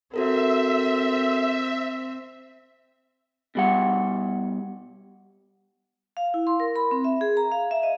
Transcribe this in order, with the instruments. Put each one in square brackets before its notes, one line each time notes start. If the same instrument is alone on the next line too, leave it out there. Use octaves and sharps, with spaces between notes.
[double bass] C4 [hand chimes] F#4 A4 A#4 [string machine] E5
[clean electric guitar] B2 G3 F#5
[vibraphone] F5
E4
C6
A#4
B5
C4
E5
G#4
A#5
F5
E5
D#5